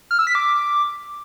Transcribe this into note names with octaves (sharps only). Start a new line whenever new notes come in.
F6
E6
B6
D6